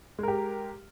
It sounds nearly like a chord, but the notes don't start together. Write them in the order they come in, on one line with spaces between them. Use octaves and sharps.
G#3 A#4 G4